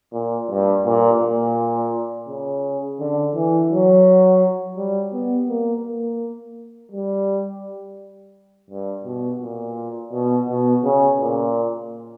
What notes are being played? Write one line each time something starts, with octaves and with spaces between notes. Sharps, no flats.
A#2
G2
A#2
A#2
C#3
D3
E3
F#3
G3
B3
A#3
A#3
G3
G2
B2
A#2
B2
B2
C#3
A#2